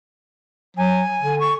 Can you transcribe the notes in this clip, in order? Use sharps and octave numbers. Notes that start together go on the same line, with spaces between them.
F#3 G#5
D3
C#6